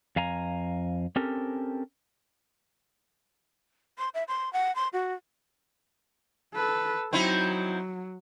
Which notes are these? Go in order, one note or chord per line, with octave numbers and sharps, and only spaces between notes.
F2 F5 G#5 A#5
C4 C#4 G4 A4 A#4
C6
E5
C6
F#5
C6
F#4
A4 B4
F#3 C4 D#4 E4